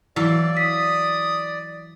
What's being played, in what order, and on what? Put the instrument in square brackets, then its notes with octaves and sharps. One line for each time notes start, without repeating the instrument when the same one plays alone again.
[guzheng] E3 F#3 F5 [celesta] E4 [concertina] D5
[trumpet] D#6 [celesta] B6